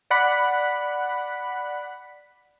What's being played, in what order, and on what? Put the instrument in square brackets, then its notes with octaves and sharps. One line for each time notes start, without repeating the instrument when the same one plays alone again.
[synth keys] D5 F#5 B5 F#6 B6